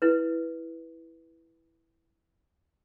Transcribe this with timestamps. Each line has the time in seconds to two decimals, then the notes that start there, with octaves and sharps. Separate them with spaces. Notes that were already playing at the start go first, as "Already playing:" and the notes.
0.02 E4 B4